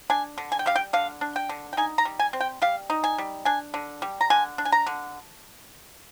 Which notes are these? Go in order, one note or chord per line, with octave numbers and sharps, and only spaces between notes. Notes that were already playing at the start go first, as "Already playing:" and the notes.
D4 G#5
D3
G#5
G5
G3 F5
G5
D3 F5
D4
G5
D3
G5
D#4 G#5
A#5
G3
G#5
C4
G5
G3 F5
D#4
G#5
G3
D4 G#5
D3
G3
A#5
D3 G#5
D4
G#5
A#5
D3